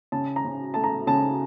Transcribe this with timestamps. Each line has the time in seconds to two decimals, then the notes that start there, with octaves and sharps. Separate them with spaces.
0.12 C#3 A5
0.36 A#5
0.44 C#3
0.74 A3 A5
0.84 A#5
1.07 C#3 A5